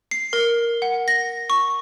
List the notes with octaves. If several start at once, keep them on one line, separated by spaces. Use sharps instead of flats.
C7
A#4
F#5
A#6
C#6